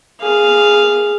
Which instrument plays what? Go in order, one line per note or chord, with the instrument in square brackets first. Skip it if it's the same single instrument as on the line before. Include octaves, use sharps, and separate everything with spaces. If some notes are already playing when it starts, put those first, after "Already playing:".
[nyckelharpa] G#4 F5